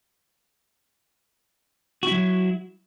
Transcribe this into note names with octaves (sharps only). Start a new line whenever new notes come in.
F#3 E4 F#4